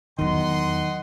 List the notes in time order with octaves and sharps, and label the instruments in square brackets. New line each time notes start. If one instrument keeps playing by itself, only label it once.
[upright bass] E2 F#3 [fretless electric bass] D#3 [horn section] D#5 F#5 C6